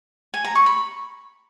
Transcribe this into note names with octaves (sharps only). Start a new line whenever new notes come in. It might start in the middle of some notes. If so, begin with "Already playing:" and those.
G#5
A#5
C#6
B5